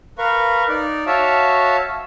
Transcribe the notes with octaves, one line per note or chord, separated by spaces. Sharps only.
A#4 B4 F5 C#6
D#4 D5
F#4 C#5 E5 F5 A5